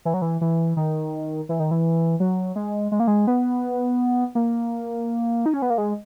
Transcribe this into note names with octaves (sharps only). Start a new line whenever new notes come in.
E3
F#3
E3
E3
D#3
E3
D#3
E3
F#3
G#3
G#3
A#3
G#3
B3
A#3
D#4
C#4
B3
A#3
G#3